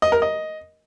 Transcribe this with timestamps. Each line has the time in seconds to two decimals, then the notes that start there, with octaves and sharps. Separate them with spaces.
0.02 D#5
0.12 A#4
0.22 D#5